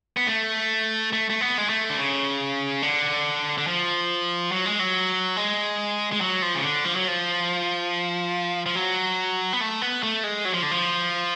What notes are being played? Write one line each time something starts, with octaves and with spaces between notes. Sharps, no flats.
B3
A3
A3
A3
B3
G#3
A3
D3
C#3
D3
D3
F3
F#3
G#3
F#3
G#3
G#3
F#3
F3
C#3
D3
F3
F#3
F3
F3
F#3
B3
A3
B3
A3
G#3
F#3
F3
D3
F3